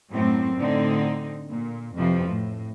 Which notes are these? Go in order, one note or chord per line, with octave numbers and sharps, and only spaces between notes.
F#2 A2 F#3 C4
A2 D3 C4 D#4
A#2
F2 C3 E3 F3
A2